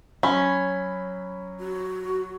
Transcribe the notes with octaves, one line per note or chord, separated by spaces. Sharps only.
F#3 C#4 B5
F#4